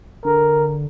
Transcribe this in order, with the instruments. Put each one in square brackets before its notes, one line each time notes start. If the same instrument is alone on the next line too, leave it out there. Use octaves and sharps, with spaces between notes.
[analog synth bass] D3 [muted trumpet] A#4